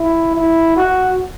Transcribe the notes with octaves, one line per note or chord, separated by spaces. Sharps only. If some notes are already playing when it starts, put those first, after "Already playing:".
Already playing: E4
E4
F#4